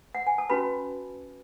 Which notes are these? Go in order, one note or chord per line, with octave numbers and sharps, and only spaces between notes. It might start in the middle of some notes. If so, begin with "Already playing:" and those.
F#5
G#5
A5
C#4 F#4 B4 B5